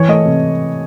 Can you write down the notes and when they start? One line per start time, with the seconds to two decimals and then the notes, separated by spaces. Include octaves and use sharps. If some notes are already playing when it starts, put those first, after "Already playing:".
Already playing: E3 C#5
0.08 A3 D#5
0.26 C3